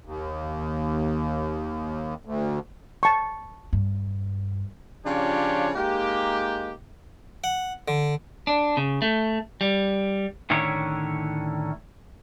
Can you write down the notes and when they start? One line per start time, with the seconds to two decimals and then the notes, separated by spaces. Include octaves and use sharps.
0.05 D#2
2.25 D2
3.03 A5 C#6
3.73 G2
5.06 C#3 F3 D4 F4 G4 C#5
5.76 G#3 A#3 D#4 G4
7.44 F#5
7.88 D3
8.47 D4
8.77 C#3
9.02 A3
9.61 G3
10.50 A2 D3 D#3 C#4 E4 C#5